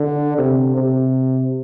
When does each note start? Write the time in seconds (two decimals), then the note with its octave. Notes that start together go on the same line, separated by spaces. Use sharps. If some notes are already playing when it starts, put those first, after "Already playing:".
Already playing: D3
0.38 C3
0.77 C3